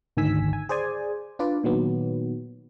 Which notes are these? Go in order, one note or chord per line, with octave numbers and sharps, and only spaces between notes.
G#1 D2 D#3 G#5 E6 B6
G#5
G#4 C5 D5 G#5
D4 F4 B4 D5
A#2 D#3 F#3 B3